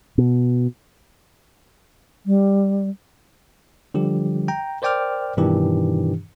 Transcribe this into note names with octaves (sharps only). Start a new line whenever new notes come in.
B2
G3
D3 F3 G3 G4
G5 A#5
A#4 C5 D5 G5 D6 F6
G2 B2 D#3 E3 D4 G4